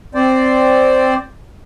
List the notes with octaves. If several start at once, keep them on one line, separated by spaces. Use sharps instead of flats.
C4 C5 D5